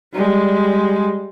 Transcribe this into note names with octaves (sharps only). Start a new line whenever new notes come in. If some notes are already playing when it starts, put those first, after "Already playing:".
G3 G#3